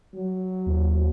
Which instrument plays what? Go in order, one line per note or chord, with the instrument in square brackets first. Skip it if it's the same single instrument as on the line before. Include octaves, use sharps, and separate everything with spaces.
[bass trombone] F#3
[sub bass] D#2